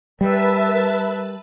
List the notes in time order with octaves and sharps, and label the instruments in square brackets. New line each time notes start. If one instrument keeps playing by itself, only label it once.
[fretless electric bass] G3 [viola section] A#4 E5 [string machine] B4 A5